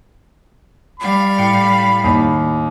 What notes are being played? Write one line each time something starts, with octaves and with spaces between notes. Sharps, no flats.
G3 F5 B5
A2 G5 C#7
D#2